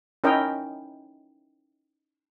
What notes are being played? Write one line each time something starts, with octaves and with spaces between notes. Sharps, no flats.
C#4 D#4 E4 A#4 D#5 G5